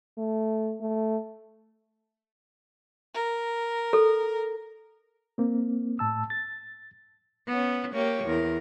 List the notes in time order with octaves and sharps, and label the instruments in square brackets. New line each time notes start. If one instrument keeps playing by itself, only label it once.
[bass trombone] A3
A3
[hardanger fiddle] A#4
[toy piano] A4
[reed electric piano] A#3 C4
A2 A5 E6
A6
[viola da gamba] B3 C#4
A#3 G4 C#5
E2 A#4